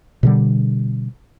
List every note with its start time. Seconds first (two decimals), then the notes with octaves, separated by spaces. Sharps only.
0.23 B2 D3 G3